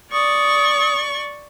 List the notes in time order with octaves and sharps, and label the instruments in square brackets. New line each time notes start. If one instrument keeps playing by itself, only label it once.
[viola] D5 C#6 [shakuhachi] D#6